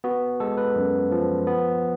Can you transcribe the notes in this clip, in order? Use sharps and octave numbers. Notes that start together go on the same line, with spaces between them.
B3 F#4
G#3 A4
B4
F#2
F3
B3